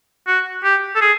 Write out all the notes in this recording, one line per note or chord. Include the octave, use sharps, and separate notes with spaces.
F#4
G4
A4
G#4